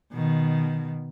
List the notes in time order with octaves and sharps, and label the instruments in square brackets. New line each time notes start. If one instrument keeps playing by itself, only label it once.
[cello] B2 D#3